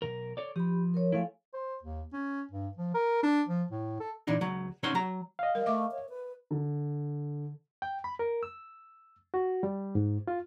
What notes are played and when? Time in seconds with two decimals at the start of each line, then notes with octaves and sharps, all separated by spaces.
0.02 B1 A#2 A#4
0.37 A4 C#5 D5
0.56 F3 G4 B5
0.94 A#4 C#5
1.12 F3 A3 E4 A4 F5 G#5
1.54 C5
1.83 D#2
2.13 C#4
2.51 G2
2.77 F3
2.94 A#4
3.23 D4
3.48 F3
3.71 A2
4.00 A4
4.27 A#2 E3 D4 D#4
4.41 C#2 F#3
4.83 C3 C#4 D#4 C#5 F#5 C6
4.95 F#3 A#5
5.39 D#5 F5
5.55 G3 A#4
5.66 A3 E5 D6
5.91 C#5
6.09 B4
6.51 D3
7.82 G5
8.04 B5
8.19 A#4
8.43 E6
9.34 F#4
9.63 G3
9.95 G#2
10.28 F4